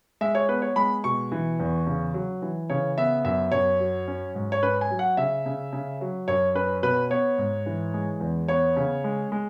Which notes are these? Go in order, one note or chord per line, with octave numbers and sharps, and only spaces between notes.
G#3 E5
C#5
B3 B4
C#5
G#3 B5
B2 C#6
E3
E2
C#3
F#3
E3
C#3 C#5
B3 E5
F#2 E5
F#2 C#5
F#3
C#4
G#2
C#5
C#4 B4
G#5
F#3
F#5
C#3 E5
C#3
C#3
F#3
F#2 C#5
C#4 B4
B2 B4
B3 C#5
G#2
E3
G#3
E2
B3 C#5
C#3
G#3
G#3